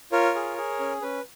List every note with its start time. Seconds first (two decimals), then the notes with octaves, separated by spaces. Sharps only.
0.12 F4 A#4 C#5
0.35 G#4
0.57 G#4
0.79 C#4
1.02 C#4 B4